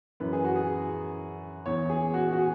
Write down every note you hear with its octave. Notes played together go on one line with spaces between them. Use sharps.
F#2 E3 B4
G#4
F#4
G#4
E2 E3 C#5
G#4
F#4
F#4
G#4